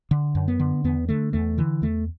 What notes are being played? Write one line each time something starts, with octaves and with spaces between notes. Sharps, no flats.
D3
F#2
B3
D3
E2 B3
D3 A3
E2 A3
D3 E3
E2 A3